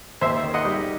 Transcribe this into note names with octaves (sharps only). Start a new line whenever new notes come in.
D#2 C5 E5
D#3
D#5 F#5
G3